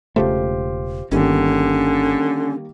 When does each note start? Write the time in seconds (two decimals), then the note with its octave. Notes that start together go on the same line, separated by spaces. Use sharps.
0.16 E1 C#3 A3 F4 G4 C5
1.11 G1 D3 D#3 G3 A#3 C#4